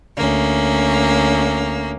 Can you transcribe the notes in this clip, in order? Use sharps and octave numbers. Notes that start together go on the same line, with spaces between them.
D2 A#3 C#4